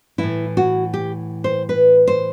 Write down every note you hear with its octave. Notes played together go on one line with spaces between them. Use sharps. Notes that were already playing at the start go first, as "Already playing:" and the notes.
A2 E3 E4
F#4
G4
C5
B4
C5